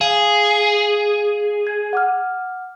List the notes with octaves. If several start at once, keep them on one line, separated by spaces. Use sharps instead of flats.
G#4 F5
G#6
F#5 D6 F6